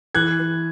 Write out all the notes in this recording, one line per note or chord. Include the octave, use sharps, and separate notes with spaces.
E3 F#6 G#6
E3